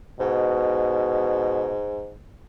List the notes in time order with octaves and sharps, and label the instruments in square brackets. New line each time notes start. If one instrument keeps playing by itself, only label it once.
[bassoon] G#2 [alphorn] B2